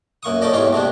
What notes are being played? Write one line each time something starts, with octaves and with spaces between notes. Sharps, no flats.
F#2 A#3 C#6 D#6
C#4 D#4 A4 D5 D#5
E2 G#2 G4 C#5 C6
C3 F3 A#3 D4